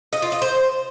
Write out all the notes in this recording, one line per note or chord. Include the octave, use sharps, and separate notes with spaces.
D#5
F4
D#5
C5